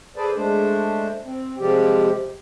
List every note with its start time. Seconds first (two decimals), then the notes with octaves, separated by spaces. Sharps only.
0.16 G#4 A4 B4 C5 D5
0.36 G#3 A3 D4 C5
1.25 C4
1.58 C3 F3 G3 G#3 G4